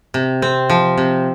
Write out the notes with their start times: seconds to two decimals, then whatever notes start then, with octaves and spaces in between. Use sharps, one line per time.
0.14 C3
0.42 C4
0.70 F3
0.98 C3